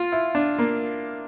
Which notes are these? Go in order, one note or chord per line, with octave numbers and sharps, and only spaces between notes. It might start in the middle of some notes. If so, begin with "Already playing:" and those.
Already playing: F4
E4
D4
A#3